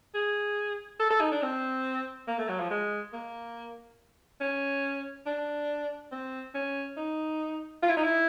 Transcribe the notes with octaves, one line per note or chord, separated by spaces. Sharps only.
G#4
A4
A4
D#4
D4
C4
A#3
A3
F#3
F3
G#3
A#3
C#4
D4
C4
C#4
D#4
F4
E4
D#4
E4